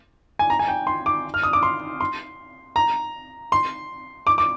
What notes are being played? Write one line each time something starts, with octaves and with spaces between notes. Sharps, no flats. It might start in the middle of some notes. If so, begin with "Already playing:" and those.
G#5
A#5
G#5
G5
C6
D6
F6
D#6
D6
C6
C6
A#5
C6
D6
D6